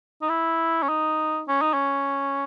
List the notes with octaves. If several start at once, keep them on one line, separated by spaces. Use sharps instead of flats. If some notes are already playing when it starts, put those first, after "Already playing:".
D#4
E4
C#4
D#4
C#4
D#4
C#4